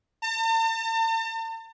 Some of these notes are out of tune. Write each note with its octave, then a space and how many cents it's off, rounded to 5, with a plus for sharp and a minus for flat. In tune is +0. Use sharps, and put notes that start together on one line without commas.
A5 +45